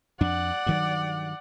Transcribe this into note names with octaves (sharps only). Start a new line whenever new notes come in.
F2 D4 D5 F#5
G2 D#3 F#3